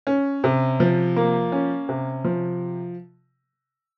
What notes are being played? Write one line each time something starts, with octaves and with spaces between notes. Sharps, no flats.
C#4
C3
F3
A#3
C#4
C3
F3